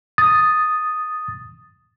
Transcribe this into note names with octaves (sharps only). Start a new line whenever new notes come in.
D#6 A6